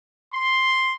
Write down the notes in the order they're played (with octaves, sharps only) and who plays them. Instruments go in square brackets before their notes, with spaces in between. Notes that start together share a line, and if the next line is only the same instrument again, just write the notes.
[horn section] C6